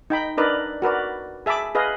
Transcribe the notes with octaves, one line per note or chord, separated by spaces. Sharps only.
D#4 G5 B5
D4 D#4 A#4 B4 D5 D#5
F#4 A#4 B4 D5
G#4 E5 A5 B5 D6
G#4 B4 D#5 F5